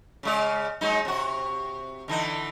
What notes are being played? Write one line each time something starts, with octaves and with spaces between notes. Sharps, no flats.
C#3 G#3 D5
F#3 G#3 D#4
C3 F#4
D3 E3 D#4